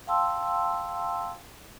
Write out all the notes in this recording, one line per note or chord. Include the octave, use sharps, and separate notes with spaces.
F5 G5 A5 C6 E6